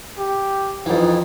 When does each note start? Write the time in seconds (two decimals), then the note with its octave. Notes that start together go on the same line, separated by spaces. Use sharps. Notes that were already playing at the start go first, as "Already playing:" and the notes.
0.19 G4
0.86 F2 E3 D#4